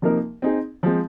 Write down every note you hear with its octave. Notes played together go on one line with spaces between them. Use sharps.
C3 F3 A#3 D#4 A#4
C4 D#4 G#4
F3 G#3 C4